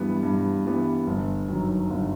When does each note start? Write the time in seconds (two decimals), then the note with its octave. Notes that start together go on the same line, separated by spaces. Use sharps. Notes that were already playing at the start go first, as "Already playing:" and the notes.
Already playing: G2 E3 G3 B3
0.23 G2
0.65 E3 G3 B3
1.07 G1
1.49 F#2 D#3 F#3
1.90 G1